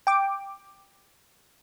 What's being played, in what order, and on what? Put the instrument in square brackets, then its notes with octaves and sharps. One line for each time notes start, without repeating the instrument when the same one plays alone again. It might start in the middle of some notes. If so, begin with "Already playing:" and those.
[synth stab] G5 D6